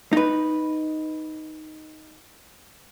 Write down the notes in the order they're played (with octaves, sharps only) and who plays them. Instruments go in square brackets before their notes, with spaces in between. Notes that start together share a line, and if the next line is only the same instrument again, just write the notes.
[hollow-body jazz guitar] D#4 B4